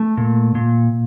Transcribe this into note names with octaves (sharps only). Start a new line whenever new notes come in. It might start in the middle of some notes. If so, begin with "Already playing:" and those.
Already playing: A3
A#2
A#2